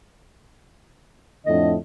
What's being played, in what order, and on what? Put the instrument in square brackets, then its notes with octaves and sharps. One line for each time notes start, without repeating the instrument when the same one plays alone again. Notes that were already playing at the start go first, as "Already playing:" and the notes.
[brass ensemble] F2 A2 D3 [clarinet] D#5